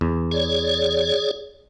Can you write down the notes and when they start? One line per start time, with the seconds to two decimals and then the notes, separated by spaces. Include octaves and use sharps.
0.01 E2
0.31 G#4 C#5 D5